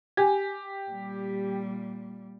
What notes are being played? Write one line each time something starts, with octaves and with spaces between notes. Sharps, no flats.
G4 G#5
A#2 G3